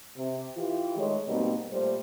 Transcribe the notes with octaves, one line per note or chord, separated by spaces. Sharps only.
C3
E3 F4 G4
D#3 G#3 A3 G#4 C#5
G#2 B2 G3 A#3 C4 D#4
A#2 G3 A3 G4 C5